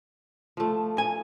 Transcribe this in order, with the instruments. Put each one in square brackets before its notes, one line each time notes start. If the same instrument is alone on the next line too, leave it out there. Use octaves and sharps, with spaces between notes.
[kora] F3 A3
[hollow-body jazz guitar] G#5